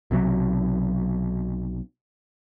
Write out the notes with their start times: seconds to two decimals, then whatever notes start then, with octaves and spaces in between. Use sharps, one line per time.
0.11 B1 C3 E3 F#3